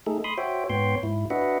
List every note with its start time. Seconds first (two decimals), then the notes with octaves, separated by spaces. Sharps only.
0.06 A3 D#4 G#4 A4
0.24 B5 C6 D#6
0.38 F#4 C5 C#5 E5 G5
0.70 G#2 B3 C#5 G5 C6
1.03 G#2 E4
1.30 D4 F#4 B4 D#5 E5 F#5